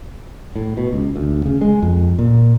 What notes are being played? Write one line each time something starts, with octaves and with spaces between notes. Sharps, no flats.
A2
B2
C#2
D2
C#3
G#3
F2
A#2